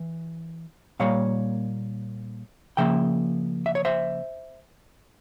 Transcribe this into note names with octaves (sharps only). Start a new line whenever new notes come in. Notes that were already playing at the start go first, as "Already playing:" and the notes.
Already playing: E3
A#2 G3 A#3 C#5 F5
C#3 F3 A#3 E5 G5
E5
C#5
C5 E5